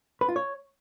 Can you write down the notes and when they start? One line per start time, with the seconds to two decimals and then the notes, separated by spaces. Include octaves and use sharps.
0.21 B4
0.29 F4
0.36 C#5